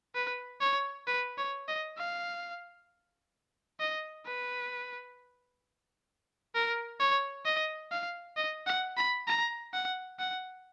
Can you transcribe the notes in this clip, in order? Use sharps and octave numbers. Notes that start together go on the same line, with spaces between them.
B4
C#5
B4
C#5
D#5
F5
D#5
B4
A#4
C#5
D#5
F5
D#5
F#5
B5
A#5
F#5
F#5